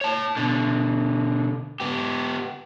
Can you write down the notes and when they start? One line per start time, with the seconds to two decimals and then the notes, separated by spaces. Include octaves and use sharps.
0.01 C#5 A5
0.37 B2 D3
1.80 B3 G4